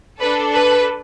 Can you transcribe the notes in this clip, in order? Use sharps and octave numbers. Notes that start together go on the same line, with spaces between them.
D4 A4 B4
B4